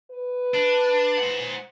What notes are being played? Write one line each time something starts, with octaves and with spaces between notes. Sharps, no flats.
B4
D4
C5 F#5